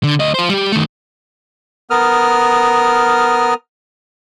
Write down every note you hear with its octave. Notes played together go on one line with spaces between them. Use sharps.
D3
D2 D#5
F4 C5
G3 G4
D#3 A3
B3 A#4 D#6 F6